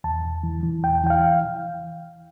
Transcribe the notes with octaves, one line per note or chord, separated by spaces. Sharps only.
E2 A5
E2
E3
E3
E2 G5
E3 G5
F5